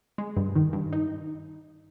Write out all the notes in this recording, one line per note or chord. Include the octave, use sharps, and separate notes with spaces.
G#3
G2
D#3
G2
D#4